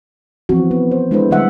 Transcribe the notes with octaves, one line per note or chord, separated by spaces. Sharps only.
E3 F3 B3 C4 F#4
B3
C5
G#3 D4 E4 A4 B4 C5
D3 F#3 G3 A3 E5 F#5